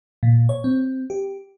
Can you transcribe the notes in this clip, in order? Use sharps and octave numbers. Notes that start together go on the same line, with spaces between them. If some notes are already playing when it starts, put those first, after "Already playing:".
A#2
C#5
C4
G4